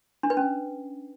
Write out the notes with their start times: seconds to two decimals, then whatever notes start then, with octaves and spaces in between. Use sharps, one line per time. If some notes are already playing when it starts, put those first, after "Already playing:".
0.23 D4
0.30 B4
0.37 C#4